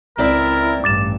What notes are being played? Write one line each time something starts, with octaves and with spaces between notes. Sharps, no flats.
C#2 C4 E4 A#4 D5 E5
A1 G2 D6 A6 E7